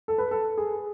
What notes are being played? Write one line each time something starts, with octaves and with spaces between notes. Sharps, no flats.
A4
B4
A4
G#4